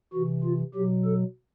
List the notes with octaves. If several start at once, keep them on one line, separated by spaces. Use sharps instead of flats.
C3 E3 F#4
F4
B2 F#3 G4
A4